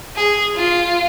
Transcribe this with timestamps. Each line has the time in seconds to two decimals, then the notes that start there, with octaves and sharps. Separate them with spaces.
0.16 G#4
0.56 F4